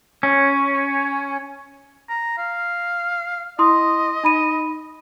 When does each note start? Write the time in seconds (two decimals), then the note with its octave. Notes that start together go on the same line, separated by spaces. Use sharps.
0.23 C#4
2.09 A#5
2.38 F5
3.59 E4 D#5 C6 D#6
4.24 D#4 B5 D#7